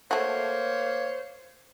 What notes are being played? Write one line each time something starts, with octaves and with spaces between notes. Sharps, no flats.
A3 A#3 F#4 C5 C#5